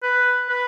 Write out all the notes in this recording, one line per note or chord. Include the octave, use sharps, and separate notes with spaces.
B4
B4